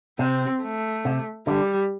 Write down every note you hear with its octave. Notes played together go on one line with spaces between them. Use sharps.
C3 C4
A3
C3
D3 G3